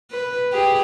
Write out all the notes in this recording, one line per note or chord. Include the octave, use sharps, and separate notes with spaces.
B4
G4 G#4